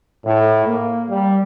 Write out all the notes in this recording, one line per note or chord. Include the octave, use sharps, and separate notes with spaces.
A2
A#3
G3